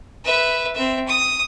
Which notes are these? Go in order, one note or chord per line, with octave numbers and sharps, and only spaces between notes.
B4 E5
C4 E5
D#6